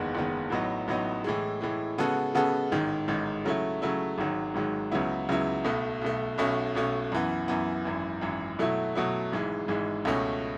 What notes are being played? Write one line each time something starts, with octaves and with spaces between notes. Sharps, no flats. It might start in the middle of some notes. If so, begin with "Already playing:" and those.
Already playing: F#1 E2 D#3 G#3 B3
F#1 E2 D#3 G#3 B3
A1 A2 F#3 B3 D#4
A1 A2 F#3 B3 D#4
A2 E3 G#3
A2 E3 G#3
C#3 G#3 B3 F#4 A4
C#3 G#3 B3 F#4 A4
A1 G#2 D#3 G#3
A1 G#2 D#3 G#3
C#3 F#3 A3 E4
C#3 F#3 A3 E4
G#1 G#2 D#3 F#3
G#1 G#2 D#3 F#3
C#2 C#3 F#3 B3 E4
C#2 C#3 F#3 B3 E4
B1 B2 A3
B1 B2 A3
B1 B2 A3 C#4
B1 B2 A3 C#4
F#2 E3 B3
F#2 E3 B3
G#1 F#2 E3
G#1 F#2 E3
B2 F#3 A3 E4
B2 F#3 A3 E4
G#1 G#2 E3 G#3
G#1 G#2 E3 G#3
C#2 B2 A3 C#4